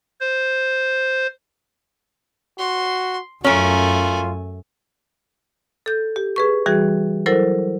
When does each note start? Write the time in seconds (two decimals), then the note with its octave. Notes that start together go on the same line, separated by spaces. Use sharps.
0.20 C5
2.59 F#4 C6
3.44 F#2 A3 C#4 F4 A#4 G#5
5.86 A4 G6
6.16 G4
6.36 G#4 B4 C#6
6.66 E3 G3 F#4 G#4
7.26 F#3 E4 A4 A#4 C5